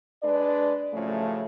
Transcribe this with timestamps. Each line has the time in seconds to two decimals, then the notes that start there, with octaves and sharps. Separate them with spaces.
0.23 G#3 D4 B4 D5
0.93 F#2 A2 C#3 F3 A3 F4